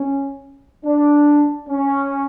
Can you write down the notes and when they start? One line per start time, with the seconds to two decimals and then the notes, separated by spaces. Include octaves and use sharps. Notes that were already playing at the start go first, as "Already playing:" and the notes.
Already playing: C#4
0.86 D4
1.69 C#4